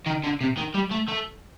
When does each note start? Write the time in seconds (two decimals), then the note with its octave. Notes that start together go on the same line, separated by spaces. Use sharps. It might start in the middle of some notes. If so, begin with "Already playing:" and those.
0.07 D#3
0.24 D3
0.41 C3
0.57 D#3
0.74 G3
0.91 A3
1.08 A3